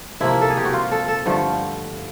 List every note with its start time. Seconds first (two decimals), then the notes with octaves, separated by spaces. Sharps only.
0.21 C3 F3 A#3 E4
0.41 A4
0.50 G#4
0.57 G4
0.65 F#4
0.73 F4
0.91 A4
1.08 A4
1.26 G2 D3 F3 A3